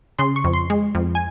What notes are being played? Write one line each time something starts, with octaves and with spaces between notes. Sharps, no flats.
C#3 C6
C#6
F2
C6
G#3
F2
G#5